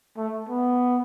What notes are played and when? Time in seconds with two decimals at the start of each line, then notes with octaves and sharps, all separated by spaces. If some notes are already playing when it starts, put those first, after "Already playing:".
0.17 A3
0.49 B3